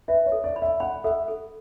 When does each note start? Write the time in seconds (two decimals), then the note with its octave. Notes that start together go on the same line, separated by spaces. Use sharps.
0.08 B4 E5
0.26 C#5
0.32 A4
0.44 D5
0.56 B5
0.62 E5
0.80 F#5 B5
1.04 A4 E5
1.28 A4